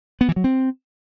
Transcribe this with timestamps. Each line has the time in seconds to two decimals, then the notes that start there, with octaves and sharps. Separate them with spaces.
0.21 B3
0.29 E3
0.36 F#3
0.44 C4